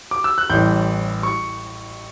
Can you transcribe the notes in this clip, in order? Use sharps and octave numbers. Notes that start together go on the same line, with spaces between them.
D6
E6
F#6
A1 A2 E3 G3 G6
C#6